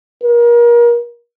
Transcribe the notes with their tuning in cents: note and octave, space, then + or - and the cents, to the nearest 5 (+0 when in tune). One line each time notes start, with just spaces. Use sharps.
A#4 +30